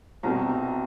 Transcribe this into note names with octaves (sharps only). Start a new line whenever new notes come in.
C2 B2 G3 C4 A#5
A#5